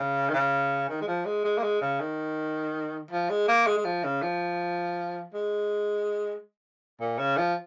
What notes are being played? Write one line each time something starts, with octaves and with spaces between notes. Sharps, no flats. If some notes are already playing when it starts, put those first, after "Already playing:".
Already playing: C#3
D#3
C#3
D#3
G#3
F3
G#3
G#3
A#3
G#3
C#3
D#3
F3
G#3
A#3
G#3
G#3
F3
C#3
F3
G#3
A#2
C#3
F3